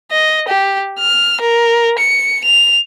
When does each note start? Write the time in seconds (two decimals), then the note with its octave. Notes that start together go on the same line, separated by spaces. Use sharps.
0.11 D#5
0.48 G4
0.99 F6
1.41 A#4
1.99 C#7
2.44 F7